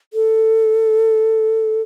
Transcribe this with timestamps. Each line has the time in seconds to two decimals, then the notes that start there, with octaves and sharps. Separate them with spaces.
0.14 A4